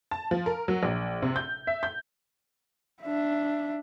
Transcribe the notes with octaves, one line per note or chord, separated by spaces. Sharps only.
A5
F3
A#4
F#3
A#1
C3
G6
E5
G6
D4 E5